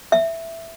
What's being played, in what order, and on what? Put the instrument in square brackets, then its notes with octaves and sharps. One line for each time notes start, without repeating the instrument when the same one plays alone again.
[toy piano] E5